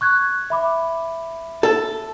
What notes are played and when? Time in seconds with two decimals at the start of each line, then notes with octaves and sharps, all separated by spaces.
0.01 C#6 F#6 G#6
0.50 E5 B5 D6
1.63 A4